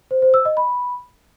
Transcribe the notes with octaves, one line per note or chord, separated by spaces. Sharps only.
C5
C5
E6
D#5
B5